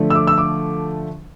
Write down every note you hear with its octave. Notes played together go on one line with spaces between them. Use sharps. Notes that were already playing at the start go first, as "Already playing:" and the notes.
Already playing: D3 F3 A3
E6
D6
E6
D6